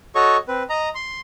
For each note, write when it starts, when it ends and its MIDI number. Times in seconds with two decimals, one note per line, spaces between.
0.15 0.37 66
0.15 0.37 69
0.15 0.37 73
0.15 0.37 75
0.15 0.37 85
0.48 0.63 60
0.48 0.63 71
0.70 0.89 75
0.70 0.89 82
0.95 1.20 84